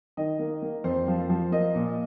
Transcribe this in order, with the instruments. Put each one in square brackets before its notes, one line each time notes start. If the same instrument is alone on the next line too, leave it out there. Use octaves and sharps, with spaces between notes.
[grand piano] D#3 D#5
A#3
A#3
F2 C5
F3
F3
A#3 D#5
A#2